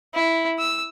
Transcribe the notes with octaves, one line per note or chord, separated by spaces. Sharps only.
E4
E6